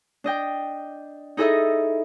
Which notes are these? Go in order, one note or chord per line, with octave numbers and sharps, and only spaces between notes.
D4 D#5 G5
D#4 E4 G#4 A4 D#5 E5